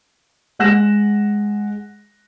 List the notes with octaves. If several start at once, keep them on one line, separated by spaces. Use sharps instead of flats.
G#3 F#5 F#6 A#6 E7